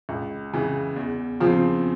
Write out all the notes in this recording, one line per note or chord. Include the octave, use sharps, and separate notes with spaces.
C#2
C#3 E3
E2
C#3 F3 C4 F4